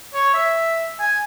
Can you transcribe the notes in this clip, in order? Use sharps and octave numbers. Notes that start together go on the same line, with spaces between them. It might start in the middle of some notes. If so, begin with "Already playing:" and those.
C#5
E5
G#5